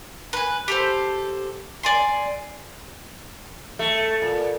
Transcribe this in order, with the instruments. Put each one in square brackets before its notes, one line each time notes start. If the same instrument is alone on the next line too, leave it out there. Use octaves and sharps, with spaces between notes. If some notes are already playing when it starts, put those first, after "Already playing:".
[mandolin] B4 G#5
G4 A4 C5
D5 G#5 C6
[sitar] A3
A#2